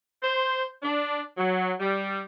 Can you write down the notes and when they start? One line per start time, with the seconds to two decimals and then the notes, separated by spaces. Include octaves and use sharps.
0.23 C5
0.83 D4
1.38 F#3
1.80 G3